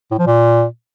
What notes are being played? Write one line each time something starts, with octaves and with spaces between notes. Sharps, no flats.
A2
F3
A#2